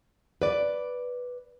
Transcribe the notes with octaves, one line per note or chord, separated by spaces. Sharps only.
B4 D5